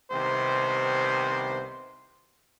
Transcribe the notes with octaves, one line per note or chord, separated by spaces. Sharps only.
C2 C3 D#3 B3 C5